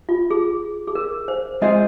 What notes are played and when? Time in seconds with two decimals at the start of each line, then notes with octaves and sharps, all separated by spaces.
0.09 F4
0.31 G#4
0.87 G#4
0.95 A#4
1.28 C5
1.62 G#3 C4 F4 G#4 C5 D#5